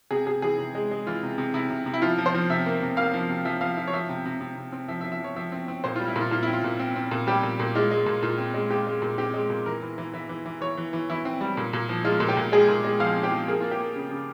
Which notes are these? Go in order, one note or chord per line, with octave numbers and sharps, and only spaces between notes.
C3 G#4
C3 G#4
E3 G#4
C3
G#3
G#3
E3 F4
C3
C3
C3 E4
C3
C3
E4
F3 F4
F3
C5
F3
C3 E5
A#3
C3
A#3 F5
F3
C3
F3 E5
F3 F5
F3 E5
C#5
F3 E5
C3
C3
C3
C3
C4
F3 E5
E5
F3
E5
F3 C#5
F3 E5
C4
C4
A#2 C5
G3 F4
E4
A#2 F4
A#2 F4
C4 E4
F4
A#2
C4
C4
A#2
G3 G4
A#2
A#2
G#3 F4
G#3
A#2
A#2 F4
C4
G#3
G#3 G4
G#3
A#2
C4 G4
G#3
A#2
E3 A#4
E3
E3
E3 E5
E3
E3
E3 C#5
E3
E3
E3 E4
C4
G3
A#2
A#2
F3
G#3 F4
A#2
G4
A#2
G#3 G#4
A#2
G#3
F3 F5
C4
G4
F3
A#3 G#4
A#3 F4
G4
A#3
C#3
C#3